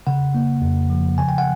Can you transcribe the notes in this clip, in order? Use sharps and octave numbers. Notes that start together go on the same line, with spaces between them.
C#3 F#5
A#3
F2
F3
C#3 G#5
G5
F#5